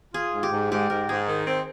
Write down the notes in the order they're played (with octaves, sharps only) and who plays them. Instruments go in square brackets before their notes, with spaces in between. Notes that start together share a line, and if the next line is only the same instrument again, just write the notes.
[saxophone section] F4 [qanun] G#4
[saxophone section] G#2
[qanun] G4
[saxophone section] G#2
[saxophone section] G#2 [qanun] G4
[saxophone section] G#2 [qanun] A#4
[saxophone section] G#2 [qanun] G#4
[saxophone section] D#3
C4